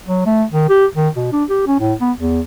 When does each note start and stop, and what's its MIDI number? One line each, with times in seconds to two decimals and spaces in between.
0.07 0.22 54
0.26 0.44 57
0.51 0.67 51
0.69 0.86 67
0.95 1.09 51
1.15 1.27 47
1.32 1.44 62
1.50 1.66 67
1.67 1.78 61
1.80 1.94 45
2.01 2.12 59
2.17 2.40 40